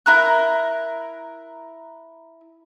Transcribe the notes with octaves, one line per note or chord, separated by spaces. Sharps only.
E4 A#4 F#6